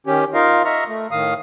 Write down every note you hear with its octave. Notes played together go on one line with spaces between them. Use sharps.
D#3 C#4 G4
D#4 F4 A#4 D#5 F5
D#5 E5 A#5 C#6 F6
A3
A2 D#3 F5 D#6